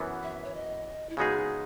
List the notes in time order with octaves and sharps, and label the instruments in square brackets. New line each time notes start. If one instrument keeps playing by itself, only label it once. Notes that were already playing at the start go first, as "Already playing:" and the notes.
Already playing: [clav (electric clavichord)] F#2 E3 B3
[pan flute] E5
C#5
D#5
E4
[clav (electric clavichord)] C#3 G#3 B3 D#4 G#4 [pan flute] F#4